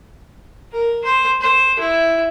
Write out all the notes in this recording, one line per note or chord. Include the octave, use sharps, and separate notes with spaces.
A#4
C5
C5
E4